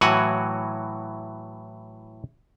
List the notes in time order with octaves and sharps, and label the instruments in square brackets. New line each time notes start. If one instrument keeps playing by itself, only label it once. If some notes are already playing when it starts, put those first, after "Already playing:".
[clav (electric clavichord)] A2 E3 F#3 F#4 F#5 G#5